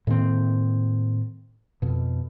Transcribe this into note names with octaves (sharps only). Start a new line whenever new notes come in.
A2 D#3 A#3 C4
F2 B2